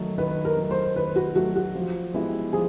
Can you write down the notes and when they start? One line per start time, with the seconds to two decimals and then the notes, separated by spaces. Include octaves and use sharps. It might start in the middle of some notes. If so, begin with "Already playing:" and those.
Already playing: D#3 F#3 A3
0.18 D#3 B4
0.45 A#4
0.57 F#3 A3
0.71 C5
0.96 D#3 B4
1.16 F#4
1.36 F#3 A3 F#4
1.56 F#4
1.75 F3
2.14 G#3 B3 E4 G4
2.53 F3 G#4